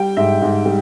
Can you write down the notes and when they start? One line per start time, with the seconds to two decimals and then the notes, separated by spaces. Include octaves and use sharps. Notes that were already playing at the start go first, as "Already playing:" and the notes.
Already playing: G3 G5
0.17 G#2 E5
0.42 G#2
0.65 G3